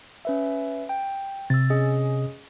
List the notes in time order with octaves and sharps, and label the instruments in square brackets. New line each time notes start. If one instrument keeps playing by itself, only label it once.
[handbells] C#4 B4 E5
G5
[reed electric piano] C3 [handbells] E6 A6
[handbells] C#4 G#4 D#5